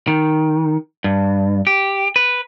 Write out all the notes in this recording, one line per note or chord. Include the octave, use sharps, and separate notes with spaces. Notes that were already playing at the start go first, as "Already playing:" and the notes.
D#3
G2
G4
B4